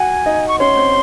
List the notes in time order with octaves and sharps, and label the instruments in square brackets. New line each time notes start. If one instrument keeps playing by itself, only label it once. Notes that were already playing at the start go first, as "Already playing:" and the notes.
Already playing: [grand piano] F#4 F#5 [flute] G#5
[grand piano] D#4 D#5
[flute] C#6
[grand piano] C#4 C#5 [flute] C6
[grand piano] C4 C5